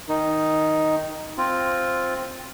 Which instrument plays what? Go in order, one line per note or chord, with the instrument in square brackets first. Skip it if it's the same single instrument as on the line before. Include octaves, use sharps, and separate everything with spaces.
[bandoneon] D#3 D#4
C4 F4